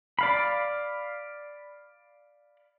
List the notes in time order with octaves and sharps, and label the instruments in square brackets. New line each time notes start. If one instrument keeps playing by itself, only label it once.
[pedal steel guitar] D5 F5 B5